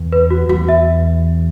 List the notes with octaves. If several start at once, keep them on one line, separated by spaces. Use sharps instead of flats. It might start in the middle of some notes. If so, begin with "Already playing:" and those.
Already playing: E2
B4
F#4
E2 F#4
E5